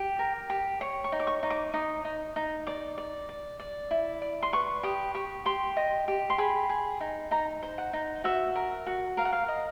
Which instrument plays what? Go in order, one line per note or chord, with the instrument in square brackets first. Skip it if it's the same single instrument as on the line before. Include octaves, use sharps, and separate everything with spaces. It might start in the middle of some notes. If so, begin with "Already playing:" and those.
Already playing: [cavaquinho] G4
A#4
G4
C#5
C#6
D#4
D6
C#6
D#4
D6
D#4 D#6
D#4
D#4
D5 D6
D5
D5
D5
E4
D5
C6
B4 C#6
G4 D#6
G4 C#6
G4 C6
D#5
G4
C6
G#4 B5
G#4
D#4
D#4 A#5
C5
F#5
D#4
F#4 E5
A#4
F#4
A#4 F5
F#5
F5
D#5